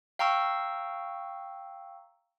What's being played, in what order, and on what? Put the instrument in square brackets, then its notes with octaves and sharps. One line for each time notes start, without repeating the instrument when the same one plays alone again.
[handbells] F5 G5 A#5 C#6 E6